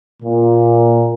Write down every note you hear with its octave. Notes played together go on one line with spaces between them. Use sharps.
A#2